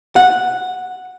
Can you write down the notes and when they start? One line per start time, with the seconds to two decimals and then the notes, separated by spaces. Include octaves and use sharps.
0.16 F#5